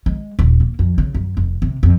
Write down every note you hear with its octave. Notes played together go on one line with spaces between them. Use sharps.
G#3
D#1
A#3
F2
C#3
F#2
F1
C3
F2